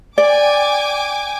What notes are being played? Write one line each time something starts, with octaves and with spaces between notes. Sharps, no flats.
D5 G5 G#5 D6